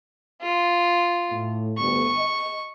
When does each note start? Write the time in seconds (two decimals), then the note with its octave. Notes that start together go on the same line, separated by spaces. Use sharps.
0.42 F4
1.31 A2
1.78 G1 D2 C#6
2.17 D#5